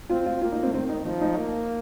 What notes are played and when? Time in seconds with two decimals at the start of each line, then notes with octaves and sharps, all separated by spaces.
0.09 C4 F4
0.26 F4
0.41 A#3 F4
0.52 D#4
0.63 C4
0.73 D#3 C4
0.89 D#4
1.05 F3 D#4
1.21 D#4
1.37 A#3